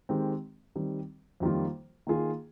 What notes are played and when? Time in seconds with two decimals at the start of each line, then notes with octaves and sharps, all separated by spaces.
0.09 D#3 G#3 C4 G4
0.75 D#3 G3 C4
1.40 F2 D#3 G3 A#3 F4
2.07 D#3 A#3 F4 G#4